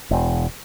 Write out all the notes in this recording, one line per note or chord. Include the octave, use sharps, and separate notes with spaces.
E1